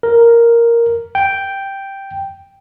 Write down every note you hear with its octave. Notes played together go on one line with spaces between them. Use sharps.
A#4
G5